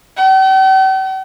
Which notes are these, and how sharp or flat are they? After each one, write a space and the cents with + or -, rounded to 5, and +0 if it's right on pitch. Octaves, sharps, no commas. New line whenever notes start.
G5 -45